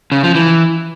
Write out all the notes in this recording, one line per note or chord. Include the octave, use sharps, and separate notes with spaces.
C#3
F3
E3